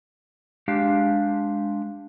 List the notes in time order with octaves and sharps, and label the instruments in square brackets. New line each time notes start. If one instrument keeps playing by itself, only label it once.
[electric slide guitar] G#3 D4 G4 F5